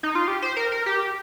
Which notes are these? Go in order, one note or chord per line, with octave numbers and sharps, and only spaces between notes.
D#4
F4
G4
C5
A#4
A#4
G4